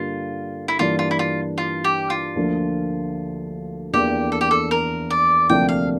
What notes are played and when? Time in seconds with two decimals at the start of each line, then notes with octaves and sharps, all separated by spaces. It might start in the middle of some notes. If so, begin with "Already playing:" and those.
Already playing: G2 D3 G3 A#3 F4
0.68 E4
0.79 G2 E3 G3 A#3 D4 F4
0.99 F4
1.11 E4
1.19 F4
1.58 F4
1.84 G4
2.10 F4
2.36 D2 D3 F3 A#3
3.93 E2 E3 A#3 D4 G4
4.32 A4
4.41 G4
4.51 A4
4.71 A#4
5.10 D5
5.49 D2 C3 F3 A#3 D4 G5
5.69 F5